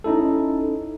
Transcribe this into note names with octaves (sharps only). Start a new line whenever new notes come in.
C#4 D#4 E4 A4